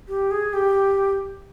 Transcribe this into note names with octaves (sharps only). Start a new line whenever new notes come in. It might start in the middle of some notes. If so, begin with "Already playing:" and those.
G4
G#4
G4